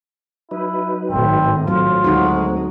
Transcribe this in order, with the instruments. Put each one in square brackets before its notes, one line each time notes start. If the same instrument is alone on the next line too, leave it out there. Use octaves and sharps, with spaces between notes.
[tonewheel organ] F#3 D#4 B4 [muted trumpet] E4
[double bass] G#1 A2 [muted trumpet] C4
[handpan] F#3 [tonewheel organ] A3 C4 [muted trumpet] F4
[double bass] D2 G#3 [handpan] D#4 F#4